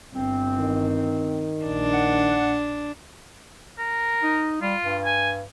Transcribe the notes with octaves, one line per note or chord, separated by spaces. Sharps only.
G1 C4
D#3
A#1 D4
F#5
A#4
D#4
G3 F4
G2
G#5